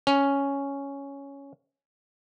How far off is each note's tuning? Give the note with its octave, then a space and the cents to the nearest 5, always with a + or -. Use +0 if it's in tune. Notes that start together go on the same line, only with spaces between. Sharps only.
C#4 +5